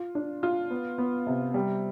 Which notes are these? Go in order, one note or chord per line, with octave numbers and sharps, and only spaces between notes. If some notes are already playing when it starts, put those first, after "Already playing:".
Already playing: F4
D4
F4
B3
B3
C3
G3